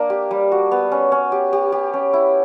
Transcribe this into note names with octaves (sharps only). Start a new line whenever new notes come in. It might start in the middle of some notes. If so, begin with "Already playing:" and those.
Already playing: A#3 D4
G4
G3
F#4
B3
C#4
C#4
G4
G4
G4
C#4
E4